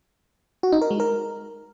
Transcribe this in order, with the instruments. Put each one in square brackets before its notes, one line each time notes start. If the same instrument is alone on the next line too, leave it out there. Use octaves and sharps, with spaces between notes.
[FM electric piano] F#4
D#4
A#4
G#3
A#4